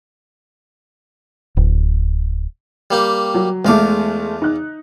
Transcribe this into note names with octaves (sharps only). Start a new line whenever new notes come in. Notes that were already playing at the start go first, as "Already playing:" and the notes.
D1
G3 A#3 G4
F#3
E2 G#3 A3 F5 D6
D#4 F#6